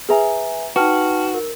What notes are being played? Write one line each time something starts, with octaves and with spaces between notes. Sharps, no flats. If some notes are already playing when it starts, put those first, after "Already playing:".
G#4 B4 E5 G#5 A#5
D#4 F#4 B4 G5 A5 F6
A#4